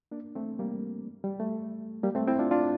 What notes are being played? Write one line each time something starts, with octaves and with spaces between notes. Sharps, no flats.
A#3 D4
A3 C4
G3 A#3
G3
A3
G3 A#3
A3 C4
C4 E4
D4 F4
D4 F4